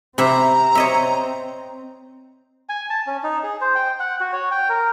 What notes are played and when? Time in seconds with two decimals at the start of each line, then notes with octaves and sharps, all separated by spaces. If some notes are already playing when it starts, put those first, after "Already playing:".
0.18 C3 C4 E5 A#5 B5
0.75 C#5 D#5 E5
2.69 G#5
2.90 A5
3.06 C#4
3.23 D#4
3.43 G#4
3.61 C5
3.75 G5
4.00 F#5
4.21 F#4
4.33 C#5
4.51 G5
4.69 A#4